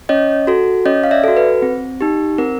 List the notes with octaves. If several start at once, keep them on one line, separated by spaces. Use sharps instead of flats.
C#4 C#5 D#5
F#4 A4
C#4 C#5 D#5
F5
D5 E5
F#4 A4
B4
C4
D#4 G4
C4 A#4